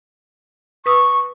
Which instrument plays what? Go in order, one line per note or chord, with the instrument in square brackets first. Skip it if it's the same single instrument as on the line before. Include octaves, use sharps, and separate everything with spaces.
[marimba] B4 D#6 E6 [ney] C#6